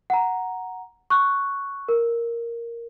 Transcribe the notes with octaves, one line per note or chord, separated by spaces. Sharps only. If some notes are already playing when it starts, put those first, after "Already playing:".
F#5 A#5
C#6 F#6
A#4